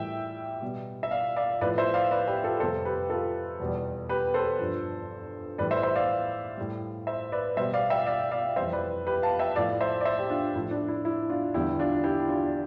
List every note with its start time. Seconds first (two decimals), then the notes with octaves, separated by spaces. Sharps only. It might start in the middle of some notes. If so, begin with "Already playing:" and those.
Already playing: A2 E3 G3 E5 G5
0.62 B2 G3
1.03 E5
1.11 D5 F5
1.36 D5 F5
1.61 A2 F3 B4 D5
1.78 C5 E5
1.94 D5 F5
2.11 B4 D5
2.28 G4 B4
2.44 F4 A4
2.60 F2 C3 G3 A4 C5
2.85 G4 B4
3.10 F4 A4
3.60 E2 B2 G3
4.09 G4 B4
4.34 A4 C5
4.59 G2 F3
5.58 A2 E3 G3 B4 D5
5.71 C5 E5
5.83 C5 E5
5.95 D5 F5
6.57 A2 G3
7.07 C5 E5
7.32 B4 D5
7.57 B2 G3 C5 E5
7.74 D5 F5
7.90 E5 G5
8.07 D5 F5
8.31 D5 F5
8.56 F2 E3 G3 C5 E5
8.73 B4 D5
9.07 G4 B4
9.22 F5 A5
9.39 E5 G5
9.55 A2 F3 D5 F5
9.81 C5 E5
10.01 D5
10.05 C5 E5
10.19 G4
10.30 D4 F4
10.55 A2 F3 E4
10.71 D4
10.88 E4
11.05 E4
11.30 D4 F4
11.54 E2 D3 G3 E4 G4
11.79 D4 F4
12.04 E4 G4
12.29 D4 F4